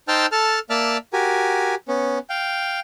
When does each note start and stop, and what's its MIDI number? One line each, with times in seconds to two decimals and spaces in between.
0.08 0.26 63
0.08 0.26 72
0.08 0.26 79
0.08 0.26 81
0.08 0.26 88
0.08 0.26 89
0.32 0.59 69
0.32 0.59 81
0.32 0.59 89
0.70 0.97 58
0.70 0.97 74
0.70 0.97 76
0.70 0.97 81
0.70 0.97 89
1.13 1.75 66
1.13 1.75 67
1.13 1.75 70
1.13 1.75 80
1.88 2.19 59
1.88 2.19 61
2.30 2.80 77
2.30 2.80 79